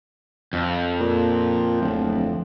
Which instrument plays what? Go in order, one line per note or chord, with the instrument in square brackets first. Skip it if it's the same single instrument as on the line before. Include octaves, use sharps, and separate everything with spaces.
[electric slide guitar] F2
[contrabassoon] A#2
D1